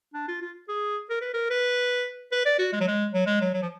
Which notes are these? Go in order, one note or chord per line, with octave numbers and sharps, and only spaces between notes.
D4
F4
F4
G#4
A#4
B4
A#4
B4
B4
D5
F#4
G#3
F#3
G#3
F#3
G#3
F#3
F#3
F3